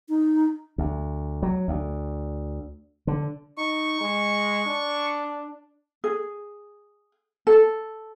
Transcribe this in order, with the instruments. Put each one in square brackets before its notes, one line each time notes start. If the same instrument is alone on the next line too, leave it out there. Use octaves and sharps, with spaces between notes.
[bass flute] D#4
[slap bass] D2
F#3
D2
D3
[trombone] D#4 [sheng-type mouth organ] C#6
[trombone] G#3
D4
[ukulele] G#4
A4